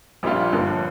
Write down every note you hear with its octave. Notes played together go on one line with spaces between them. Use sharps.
A#1 A#2 G3 D4 F4
G1 G2 F3 A#3